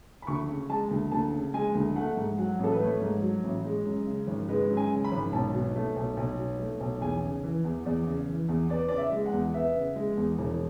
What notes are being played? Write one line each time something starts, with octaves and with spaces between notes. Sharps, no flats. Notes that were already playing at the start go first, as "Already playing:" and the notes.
B5
D2 C#6
C#3
G#3 A5
D2
D2 A5
C#3
G#3 G#5
D2
A3 F#5
G#2
F#3 F#5
A1 A4
B4
A3 C#5
G#2
F#3
A1
G#3
F#2
C#3
G#1
G#3 B4
F#2
G#5
C#3
B5
G#1
B1 A5
B2
A3
B1
B1
B2
A3
B1
E2 G#5
C#3
E3
E2
E2 D5
C#3
E3
E2
B3 D5
C#3 D5
E5
G#3
F#5
E2
B3 E5
C#3
G#3
E2
E1